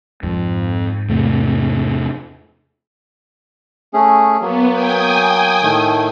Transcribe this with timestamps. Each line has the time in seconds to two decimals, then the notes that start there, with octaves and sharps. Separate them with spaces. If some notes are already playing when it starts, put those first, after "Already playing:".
0.23 F2 G#2
1.09 E2 C3 A3
3.94 A3 C#4 G#4
4.41 F#3 A#3 B3
4.70 G5 G#5 D#6
5.63 A2 D#3 A3